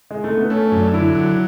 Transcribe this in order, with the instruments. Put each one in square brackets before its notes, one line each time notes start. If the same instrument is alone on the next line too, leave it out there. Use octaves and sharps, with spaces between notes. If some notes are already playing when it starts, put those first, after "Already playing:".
[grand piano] G#3
A3
B3
[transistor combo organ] A3 [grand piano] C#4
[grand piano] C#4
[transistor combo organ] F#2
[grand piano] D4
[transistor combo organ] D3 [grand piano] E4
[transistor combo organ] F#3